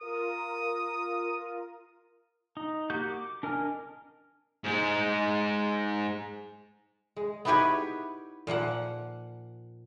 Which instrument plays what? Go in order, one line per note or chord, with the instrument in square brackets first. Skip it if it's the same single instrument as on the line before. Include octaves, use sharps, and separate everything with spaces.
[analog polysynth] F4 A#4 [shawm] D#6
[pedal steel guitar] D#4
A#3 F#4 G4 G6
D6
D4 A#4 D#5 G#5 F6
[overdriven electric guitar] G#2 G#3
[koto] G#3
B3 D#4 E4 G4 B4 C#5
A#2 F3 A#3 F#5